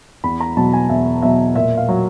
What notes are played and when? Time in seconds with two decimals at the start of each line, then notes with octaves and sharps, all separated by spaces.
0.24 E2 B5
0.40 A#5
0.57 B2 F#3 A5
0.73 G#5
0.89 E2 E5
1.22 B2 F#3 E5
1.55 A#2 E5
1.77 F5
1.89 F#3